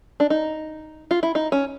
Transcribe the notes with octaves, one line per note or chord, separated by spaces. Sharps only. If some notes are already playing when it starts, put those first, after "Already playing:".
D4
D#4
F4
E4
D#4
C#4